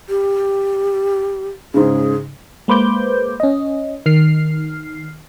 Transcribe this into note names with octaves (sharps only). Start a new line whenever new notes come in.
G4
G#2 C#3 G#4
G#3 A#3 B4 C5 D6 G6
C#4 D#5
D#3 F6 C7